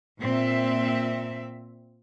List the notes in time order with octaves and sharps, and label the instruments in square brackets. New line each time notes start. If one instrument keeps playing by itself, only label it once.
[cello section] A#2 C4 E5